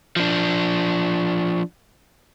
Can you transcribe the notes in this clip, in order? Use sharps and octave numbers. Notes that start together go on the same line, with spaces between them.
F3 D4